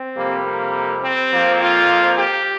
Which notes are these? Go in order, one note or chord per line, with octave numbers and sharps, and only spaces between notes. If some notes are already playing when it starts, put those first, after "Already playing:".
Already playing: C4
F2 C3 G3 A#3
A#3
C4
F2 F3 A#3
F4
G4